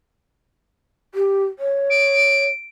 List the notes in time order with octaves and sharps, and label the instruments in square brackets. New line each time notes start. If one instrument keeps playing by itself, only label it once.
[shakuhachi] G4
C#5
[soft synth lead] D7